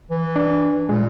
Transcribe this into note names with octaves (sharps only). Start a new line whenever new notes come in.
E3
D4
A#2 G#3